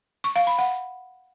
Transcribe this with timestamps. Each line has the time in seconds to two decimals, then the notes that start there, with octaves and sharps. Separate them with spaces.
0.24 C#6
0.36 F5
0.47 B5
0.59 F#5